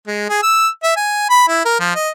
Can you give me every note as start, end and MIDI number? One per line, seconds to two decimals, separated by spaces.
0.07 0.25 56
0.29 0.41 68
0.43 0.68 88
0.83 0.92 76
0.97 1.28 80
1.30 1.45 83
1.48 1.64 64
1.65 1.76 70
1.80 1.95 53
1.95 2.10 75